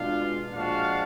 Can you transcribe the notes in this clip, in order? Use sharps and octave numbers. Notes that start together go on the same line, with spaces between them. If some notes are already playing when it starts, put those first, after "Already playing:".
Already playing: B2 G#3 D4 F4 F5
A#2 F3 G#3 D4 F#4 F5